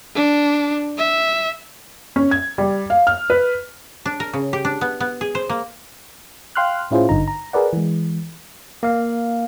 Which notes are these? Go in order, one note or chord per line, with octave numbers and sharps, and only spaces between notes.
D4
E5
C#4
G#6
G3
F5
F6
B4
D4
A#4
C#3
G4
D4
B3
B3
G#4
C5
A#3
F5 G5 C6 F6 F#6
A2 C#4 E4 F4 G#4 C5
G#1 G2 D3 D#4 A#5
A#5
G#4 A#4 B4 D5 F#5
E3 G#3
A#3 F5